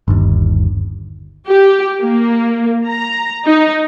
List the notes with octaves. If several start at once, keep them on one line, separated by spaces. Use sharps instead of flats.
G1 D#2
G4
A#3
A#5
D#4